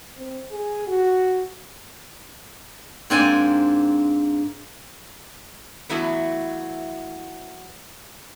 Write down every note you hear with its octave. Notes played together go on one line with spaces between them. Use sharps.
C4
G#4
F#4
G#2 A#3 C4 D4 G#5
E3 F#3 A3 B3 E4